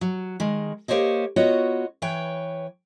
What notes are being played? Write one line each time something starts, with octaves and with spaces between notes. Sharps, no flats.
F#3
D#3 G#3
A#3 G4 C5 C#5 D#5
B3 F4 F#4 C#5 D#5
E3 B4 C#5 G5